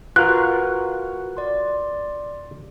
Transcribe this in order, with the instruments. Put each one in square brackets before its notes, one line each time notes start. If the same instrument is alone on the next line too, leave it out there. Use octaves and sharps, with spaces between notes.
[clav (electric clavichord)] F4 A#4 [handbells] F#4 B4 F#5 [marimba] F#6
[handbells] D5 C6